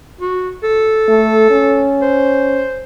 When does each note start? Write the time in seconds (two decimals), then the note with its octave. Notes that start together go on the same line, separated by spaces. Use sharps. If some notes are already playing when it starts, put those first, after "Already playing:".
0.21 F#4
0.63 A4
1.08 A3
1.51 C#4
2.02 C5